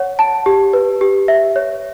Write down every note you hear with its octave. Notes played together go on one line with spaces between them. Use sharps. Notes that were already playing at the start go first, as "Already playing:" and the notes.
Already playing: C#5 F#5
A5
G4
B4
G4
E5
C#5